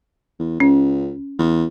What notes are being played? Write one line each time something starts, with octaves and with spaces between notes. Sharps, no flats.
E2
C#2 C#4
E2